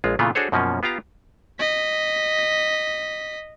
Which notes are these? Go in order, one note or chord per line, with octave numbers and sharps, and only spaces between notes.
A#1 G#3 F4
A#2 C#3 E3 A3 B3 F4
D4 F#4 G#4 A4 C5 C#5
F#2 B2 F3 A#3 C#4
B3 F4 G4 F5 A#5
D#5 B6